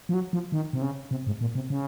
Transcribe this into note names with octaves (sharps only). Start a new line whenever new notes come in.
F3
F#3
F3
D#3
C3
C#3
C3
G#2
A#2
C3
C#3